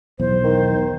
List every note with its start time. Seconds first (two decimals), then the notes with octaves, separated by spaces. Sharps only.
0.19 B1 E2 C5
0.44 D#3